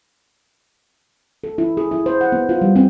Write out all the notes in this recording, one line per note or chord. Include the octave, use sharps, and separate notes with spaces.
A4
E4
G#4
E4
C5
F#5
B3
F4
G3
C4